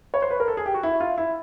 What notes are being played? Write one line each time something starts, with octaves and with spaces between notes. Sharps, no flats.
C#5
C5
B4
A#4
A4
G#4
G4
F#4
E4
F4
E4